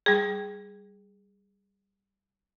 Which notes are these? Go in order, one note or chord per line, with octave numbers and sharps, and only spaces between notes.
G3 G#4